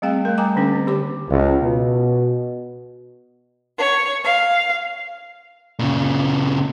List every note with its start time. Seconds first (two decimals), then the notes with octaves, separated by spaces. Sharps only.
0.02 G3 A3 C4 G#4 F5 G5
0.25 A3 A#4
0.38 G3 G5 G#5 A#5 D6
0.56 D3 A#3 C#4 D4 G#4 A#4
0.72 C4
0.87 D3 G4 C#5 D6
1.29 C#2
1.63 B2
3.78 C#5
4.23 F5
5.79 A#2 C#3